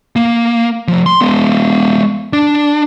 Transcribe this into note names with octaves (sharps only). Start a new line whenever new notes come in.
A#3
F3 A3
C6
G#3 B3
D4